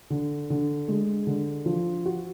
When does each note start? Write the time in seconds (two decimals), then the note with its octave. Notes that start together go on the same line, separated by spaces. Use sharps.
0.10 D3
0.50 D3
0.88 G#3
1.27 D3
1.66 F3
2.05 F#4